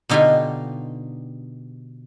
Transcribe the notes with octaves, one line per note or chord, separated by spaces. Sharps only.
B2 D3 D#4 F4 G4 G#5